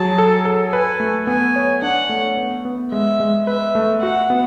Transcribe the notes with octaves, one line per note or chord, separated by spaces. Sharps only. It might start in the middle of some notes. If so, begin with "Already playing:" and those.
Already playing: F#3 G#4 A5
A4
A4
B4 G#5
A3
B3 G#5
C#5
D4 F#5
A3
B3
B3
G#3 E5
G#3
B4 E5
A3
F#4 F#5
B3